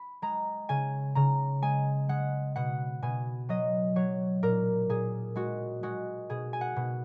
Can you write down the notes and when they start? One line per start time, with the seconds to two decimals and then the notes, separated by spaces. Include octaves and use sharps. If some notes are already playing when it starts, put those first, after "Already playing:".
Already playing: B5
0.22 G#3 A#5
0.69 C#3 G#5
1.15 C#3 A#5
1.62 G#3 G#5
2.09 G#3 F#5
2.56 B2 F#5
3.02 B2 G#5
3.49 F#3 D#5
3.96 F#3 C#5
4.43 A#2 A#4
4.89 A#2 G#4
5.35 G#3 F#4
5.83 G#3 F#4
6.30 B2 G#4
6.53 G#5
6.61 F#5
6.76 B2